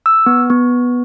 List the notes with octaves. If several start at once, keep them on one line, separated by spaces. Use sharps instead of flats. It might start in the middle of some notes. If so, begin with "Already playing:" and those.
E6
B3
B3